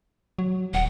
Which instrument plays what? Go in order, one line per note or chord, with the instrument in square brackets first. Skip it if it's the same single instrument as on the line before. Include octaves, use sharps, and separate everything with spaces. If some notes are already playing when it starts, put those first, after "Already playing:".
[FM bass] F#3
[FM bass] D#1 [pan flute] F#5